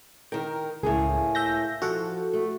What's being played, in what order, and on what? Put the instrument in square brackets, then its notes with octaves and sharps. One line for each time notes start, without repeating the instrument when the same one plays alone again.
[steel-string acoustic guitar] D#3 A#4 [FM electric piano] G5
[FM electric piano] C#2 [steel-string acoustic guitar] A2 A#3 G#4
[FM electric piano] E5 G6 A#6
[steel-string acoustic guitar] F3 [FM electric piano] F#4 A4 F#5
[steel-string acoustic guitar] A3